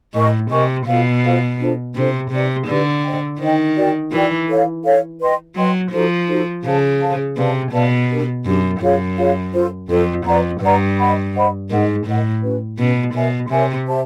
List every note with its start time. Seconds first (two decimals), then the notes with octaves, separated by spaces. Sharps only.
0.14 A2 A#4 D#5 G#5 C#6
0.51 C3 A#4 D#5 G#5 C#6
0.86 B2 F4 A4 C5 F5
1.23 F4 A4 C5 F5
1.59 D4 F4 A4 C5
1.95 C3 D4 F4 A4 C5
2.31 C3 D#4 G4 B4 D5
2.67 D3 D#4 G4 B4 D5
3.03 C5 D#5 G5
3.39 D#3 C5 D#5 G5
3.76 F#4 A#4 D5 G5
4.12 E3 F#4 A#4 D5 G5
4.48 A4 C#5 F5
4.84 A4 C#5 F5
5.21 B4 D#5 G5 C6
5.56 F#3 B4 D#5 G5 C6
5.92 F3 D#4 F#4 A4 C5
6.28 D#4 F#4 A4 C5
6.65 C#3 A4 C5 F5 A5
7.01 A4 C5 F5 A5
7.37 C3 B4 D5 F5 A5
7.72 B2 B4 D5 F5 A5
8.09 D4 G4 A#4
8.46 F#2 D4 G4 A#4
8.81 F#2 F4 G#4 C#5 F5
9.17 F4 G#4 C#5 F5
9.54 F4 A4 C5
9.89 F2 F4 A4 C5
10.25 F2 B4 D5 F#5 A#5
10.61 G2 B4 D5 F#5 A#5
10.98 C5 D#5 F#5 B5
11.34 C5 D#5 F#5 B5
11.70 G#2 A#4 D#5 F#5
12.06 A2 A#4 D#5 F#5
12.42 C#4 F#4 B4
12.78 B2 C#4 F#4 B4
13.14 B2 A#4 C#5 E5 G#5
13.50 C3 A#4 C#5 E5 G#5
13.87 G4 C5 E5 A5